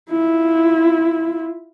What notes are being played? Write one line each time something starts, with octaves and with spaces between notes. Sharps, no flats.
E4 F4